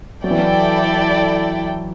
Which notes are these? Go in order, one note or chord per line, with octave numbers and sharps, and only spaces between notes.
F#3 E4 A4 D5 G5
E3
F#3